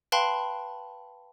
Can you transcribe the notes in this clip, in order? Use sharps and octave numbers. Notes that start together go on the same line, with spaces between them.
B4 F5 G5 A5 B5 C6